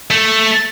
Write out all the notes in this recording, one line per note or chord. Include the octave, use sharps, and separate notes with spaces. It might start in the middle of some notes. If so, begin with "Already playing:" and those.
A3